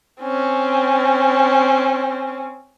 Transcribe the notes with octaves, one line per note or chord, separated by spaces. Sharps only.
C4 C#4